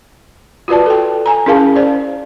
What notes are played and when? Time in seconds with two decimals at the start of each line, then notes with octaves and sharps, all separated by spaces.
0.68 F4 F#4 B4 D5 A5
0.86 A4 G5
1.26 G#5 A#5
1.46 C#4 E4 G#4 A#4 F5 A5
1.76 C5 D5